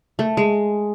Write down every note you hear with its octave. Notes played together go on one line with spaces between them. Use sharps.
A3
G#3